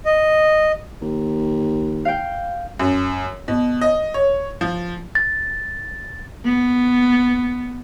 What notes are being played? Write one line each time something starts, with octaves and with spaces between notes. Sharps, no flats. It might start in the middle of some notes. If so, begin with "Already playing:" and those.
D#5
D#2
F5 G5
F#2
B2
D#5
C#5
F3
A6
B3